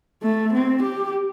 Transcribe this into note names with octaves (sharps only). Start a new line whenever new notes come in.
A3
C4
G4